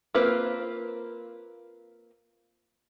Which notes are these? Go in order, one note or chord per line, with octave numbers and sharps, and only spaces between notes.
A#3 C4 F4 B4 C5